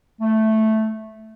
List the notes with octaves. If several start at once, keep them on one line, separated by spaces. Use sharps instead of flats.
A3